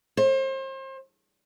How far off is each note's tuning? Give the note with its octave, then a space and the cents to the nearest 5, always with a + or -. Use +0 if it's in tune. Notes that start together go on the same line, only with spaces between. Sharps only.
C5 +35